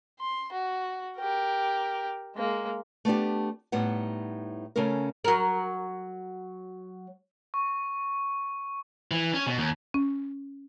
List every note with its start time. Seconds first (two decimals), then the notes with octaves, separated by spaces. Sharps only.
0.19 C6
0.52 F#4
1.16 G4 A#4
2.36 G#3 A#3
3.05 A3 B3 D4 G4
3.72 A2 G3 B3 D#4 F#5
4.76 C#3 A3 C#4 A4 A#4
5.24 F#3 A#4
7.54 C#6
9.11 E3
9.34 C#4
9.47 B2
9.58 D#2
9.94 C#4